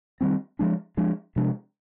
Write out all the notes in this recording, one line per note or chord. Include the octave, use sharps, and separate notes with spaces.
D#3 G3 C4
F3 G#3 D4
F3 G#3 D4
C3 F3 G#3 D4